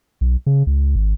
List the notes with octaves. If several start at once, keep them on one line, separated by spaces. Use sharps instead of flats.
B1
C#3
C#2
G#1